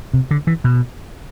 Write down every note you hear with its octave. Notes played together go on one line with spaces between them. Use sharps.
C3
D3
E3
B2